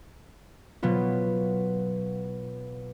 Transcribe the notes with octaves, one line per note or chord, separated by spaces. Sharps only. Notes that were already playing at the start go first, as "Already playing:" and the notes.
B2 F#3 B3 F4